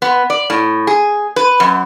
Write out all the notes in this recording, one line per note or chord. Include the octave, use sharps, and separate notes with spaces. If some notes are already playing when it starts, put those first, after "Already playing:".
B3
D5
A2
G#4
B4
F#2